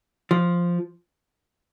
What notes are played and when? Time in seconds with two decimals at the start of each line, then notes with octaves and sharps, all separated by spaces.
0.31 F3